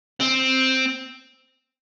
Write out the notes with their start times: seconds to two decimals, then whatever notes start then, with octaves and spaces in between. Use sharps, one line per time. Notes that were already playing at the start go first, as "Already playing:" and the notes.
0.20 C4